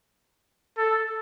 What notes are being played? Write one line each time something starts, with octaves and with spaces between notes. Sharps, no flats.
A4